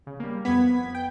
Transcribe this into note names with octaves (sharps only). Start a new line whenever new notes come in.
C#3
G3 A#3
F2 B3 G#6 B6
G5